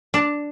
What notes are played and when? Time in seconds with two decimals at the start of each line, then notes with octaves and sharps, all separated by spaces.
0.14 D4